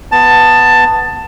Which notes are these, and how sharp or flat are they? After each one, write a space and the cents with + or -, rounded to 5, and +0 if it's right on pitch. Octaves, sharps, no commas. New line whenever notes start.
B3 +5 A5 +10